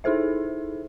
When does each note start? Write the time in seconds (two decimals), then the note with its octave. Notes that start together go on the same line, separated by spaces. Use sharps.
0.04 D#4 E4 G#4 A4 C5 E5